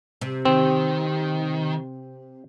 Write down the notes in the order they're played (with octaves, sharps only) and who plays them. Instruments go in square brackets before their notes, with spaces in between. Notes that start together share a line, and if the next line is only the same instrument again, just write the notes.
[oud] C3
[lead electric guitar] D#3 [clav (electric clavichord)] C4